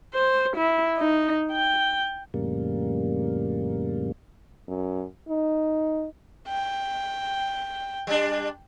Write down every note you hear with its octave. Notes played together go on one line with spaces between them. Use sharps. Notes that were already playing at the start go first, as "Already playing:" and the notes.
C5
E4
D#4
G5
F2 A2 C#3 G3 A#3
F#2
D#4
G5
G3 D4